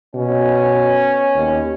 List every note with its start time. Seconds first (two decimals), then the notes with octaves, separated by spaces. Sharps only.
0.15 B2 C#4
1.35 D#2